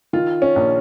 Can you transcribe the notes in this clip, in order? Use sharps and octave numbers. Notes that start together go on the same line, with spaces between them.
D#3 F4
C#4
A#1